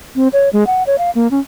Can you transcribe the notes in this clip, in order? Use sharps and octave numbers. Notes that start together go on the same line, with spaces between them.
C4
C#5
G#3
F#5
C#5
F5
A#3
C#4